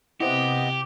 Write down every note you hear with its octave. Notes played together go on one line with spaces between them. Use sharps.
C3 B3 E4 G4 C5 D#5 F#5